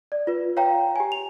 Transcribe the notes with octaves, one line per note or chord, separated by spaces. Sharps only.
D5
F4 B4
C#5 F5 G5 A#5
G4 G#5
F7